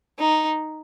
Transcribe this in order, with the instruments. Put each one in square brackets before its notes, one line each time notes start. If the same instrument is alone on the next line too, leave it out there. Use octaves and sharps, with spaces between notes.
[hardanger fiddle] D#4